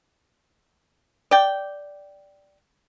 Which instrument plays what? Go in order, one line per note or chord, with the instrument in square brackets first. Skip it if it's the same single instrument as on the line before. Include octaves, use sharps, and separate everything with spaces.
[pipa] D5 G5